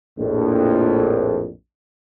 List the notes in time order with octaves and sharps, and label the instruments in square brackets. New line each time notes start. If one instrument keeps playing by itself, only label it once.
[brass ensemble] A#1 F2 A2